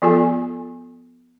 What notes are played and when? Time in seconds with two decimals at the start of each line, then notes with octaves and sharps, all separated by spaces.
0.02 F3 B3 F4 G#4 A4 G#5